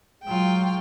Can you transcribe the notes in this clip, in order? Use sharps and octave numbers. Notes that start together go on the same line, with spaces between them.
F#3 G#3 F4 G5